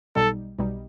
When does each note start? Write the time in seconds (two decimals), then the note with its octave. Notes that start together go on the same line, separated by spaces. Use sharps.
0.16 B1 B2 G3 D#4 A4
0.59 B1 B2 G3 D#4